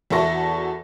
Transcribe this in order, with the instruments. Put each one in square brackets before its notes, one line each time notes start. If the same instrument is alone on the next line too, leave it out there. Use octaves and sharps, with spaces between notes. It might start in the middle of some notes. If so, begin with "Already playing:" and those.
[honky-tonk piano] E2 E4 F#4 A4 C#6 A#6